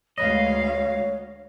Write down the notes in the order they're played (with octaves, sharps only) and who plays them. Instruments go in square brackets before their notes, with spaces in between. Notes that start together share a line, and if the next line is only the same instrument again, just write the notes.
[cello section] D2 G#3 F5 [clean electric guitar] B4 D#5 [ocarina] C#5